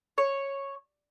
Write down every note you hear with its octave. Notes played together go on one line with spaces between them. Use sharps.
C#5